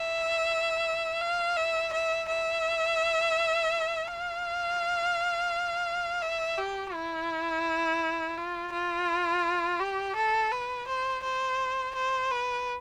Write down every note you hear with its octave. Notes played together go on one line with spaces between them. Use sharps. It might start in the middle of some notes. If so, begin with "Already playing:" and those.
Already playing: E5
F5
E5
E5
E5
F5
E5
G4
E4
F4
F4
G4
A4
B4
C5
C5
C5
B4